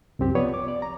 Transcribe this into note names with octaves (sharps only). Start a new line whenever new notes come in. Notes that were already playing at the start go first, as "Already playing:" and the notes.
C2 F#2 C4 G4
F3 B3 B4 C#5 D5
D6
D5
A#5